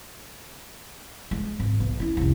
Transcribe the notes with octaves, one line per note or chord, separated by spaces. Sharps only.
G#3
G#1
B1
C#4 E4
F1 C2